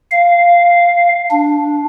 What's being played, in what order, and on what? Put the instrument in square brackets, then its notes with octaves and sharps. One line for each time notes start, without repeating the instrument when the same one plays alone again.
[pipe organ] F5
D4